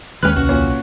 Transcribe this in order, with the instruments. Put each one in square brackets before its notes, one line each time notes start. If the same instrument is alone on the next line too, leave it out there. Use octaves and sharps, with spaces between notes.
[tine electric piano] D#2 F6 F#6 [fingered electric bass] D#3 G#3 [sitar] C#4 G4 B4
[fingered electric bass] C2 [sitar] F#4
[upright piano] A#2 C#4